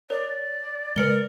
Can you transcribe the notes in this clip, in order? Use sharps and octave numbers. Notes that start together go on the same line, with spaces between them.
A#4 C#5 D5
C#3 G#3 A#4 B4 C#7 G7